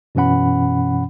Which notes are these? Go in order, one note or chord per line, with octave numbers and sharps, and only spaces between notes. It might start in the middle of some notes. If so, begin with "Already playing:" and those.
F#2 B2 E3 C#4 F#5 B5